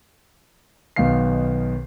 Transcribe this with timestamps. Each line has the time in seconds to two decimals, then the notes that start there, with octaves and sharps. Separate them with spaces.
0.96 B1 B2 D#3 B3 F5 C7